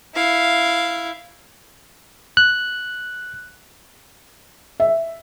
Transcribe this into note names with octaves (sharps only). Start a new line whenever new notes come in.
E4 F5
F#6
E5